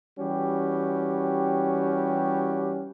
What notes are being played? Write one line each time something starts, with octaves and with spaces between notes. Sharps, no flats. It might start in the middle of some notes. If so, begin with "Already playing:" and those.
E3 G3 C#4 F#4 G4